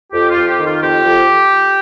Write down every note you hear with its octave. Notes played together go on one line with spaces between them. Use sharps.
F2 G4
F4
F2
G4
D#3
F4
F2 G4
F2